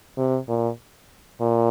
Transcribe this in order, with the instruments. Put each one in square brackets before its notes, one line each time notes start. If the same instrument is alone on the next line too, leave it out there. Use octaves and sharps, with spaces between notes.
[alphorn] C3
A#2
A#2